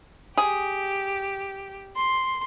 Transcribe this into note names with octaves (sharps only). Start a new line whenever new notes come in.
G4 G#4
C6